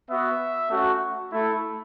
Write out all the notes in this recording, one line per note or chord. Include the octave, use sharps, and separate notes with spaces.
B3 F#4 E5
A3 C#4 F#4
A3 E4